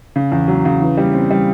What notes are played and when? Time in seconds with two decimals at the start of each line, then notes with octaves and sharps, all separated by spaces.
0.16 C#3
0.32 E2
0.48 F#3
0.65 C#3
0.81 E3
0.97 G3
1.14 C4
1.31 G3